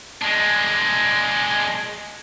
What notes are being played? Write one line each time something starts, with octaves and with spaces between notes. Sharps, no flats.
G#3 D4